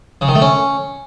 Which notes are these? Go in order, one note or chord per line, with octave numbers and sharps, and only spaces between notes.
C#3
D#3
A3
C#4